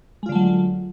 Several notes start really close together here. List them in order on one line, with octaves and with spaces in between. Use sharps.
G#3 F4 D3 A3 F#3